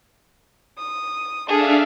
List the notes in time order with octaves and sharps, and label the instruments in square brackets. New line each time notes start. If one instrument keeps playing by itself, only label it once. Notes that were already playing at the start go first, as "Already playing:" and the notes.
[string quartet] D#6
[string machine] D4 E5 F5 [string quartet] G#4 A4